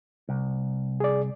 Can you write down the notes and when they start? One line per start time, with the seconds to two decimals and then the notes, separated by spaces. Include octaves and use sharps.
0.29 C2
1.00 G#4 D5